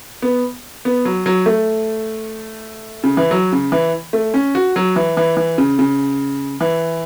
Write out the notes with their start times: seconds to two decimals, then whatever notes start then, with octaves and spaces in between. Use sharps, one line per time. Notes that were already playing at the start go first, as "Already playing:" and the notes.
0.22 B3
0.85 B3
1.05 F#3
1.26 F#3
1.46 A3
3.04 C#3
3.17 E3
3.31 F#3
3.52 C#3
3.72 E3
4.13 A3
4.34 C#4
4.55 F#4
4.76 F#3
4.96 E3
5.17 E3
5.37 E3
5.58 C#3
5.79 C#3
6.61 E3